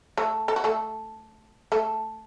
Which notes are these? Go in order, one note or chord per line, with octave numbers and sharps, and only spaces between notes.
A3 A4
A4
F#4
A3 A4
A3 A4